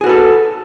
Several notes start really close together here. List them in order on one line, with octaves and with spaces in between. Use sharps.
G#4 F#4 B4 A4